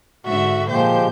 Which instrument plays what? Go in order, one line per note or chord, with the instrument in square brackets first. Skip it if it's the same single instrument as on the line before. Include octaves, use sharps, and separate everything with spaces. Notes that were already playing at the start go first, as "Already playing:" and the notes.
[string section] G#2 D3 E5 [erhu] F#4
[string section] A#2 G6 [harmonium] F3 G#3 G4 [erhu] C5